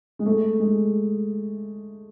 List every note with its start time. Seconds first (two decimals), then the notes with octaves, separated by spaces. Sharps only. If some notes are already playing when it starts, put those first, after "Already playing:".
0.19 G#3
0.26 A3
0.59 G#3